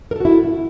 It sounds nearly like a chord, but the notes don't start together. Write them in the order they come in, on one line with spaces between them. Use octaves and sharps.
A#4 A4 F#4 E4